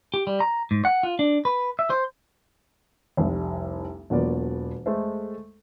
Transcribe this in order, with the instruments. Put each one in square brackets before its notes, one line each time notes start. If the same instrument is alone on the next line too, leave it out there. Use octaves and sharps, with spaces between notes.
[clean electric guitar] G4
G3
A#5
G#2
F#5
F4
D4
B4
E5
C5
[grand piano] F1 C2 G3
E1 F#3 A#3 B3 F4 D5
G#3 A3 A4 C5 E5